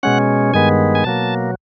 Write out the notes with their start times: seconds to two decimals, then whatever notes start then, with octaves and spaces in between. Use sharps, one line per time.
0.03 B2 G#3 C#4 F#5
0.54 G2 D#3 G#3 B3 G#5
0.95 G#5
1.04 B2 F#3 A#3 A5